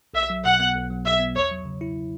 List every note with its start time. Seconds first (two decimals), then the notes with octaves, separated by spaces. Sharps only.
0.14 B1 E5
0.30 F#3
0.45 B2 F#5
0.60 B3
0.74 B1
0.90 F#3
1.05 B2 E5
1.20 B3
1.35 E2 C#5
1.51 F#3
1.65 C#3
1.81 E4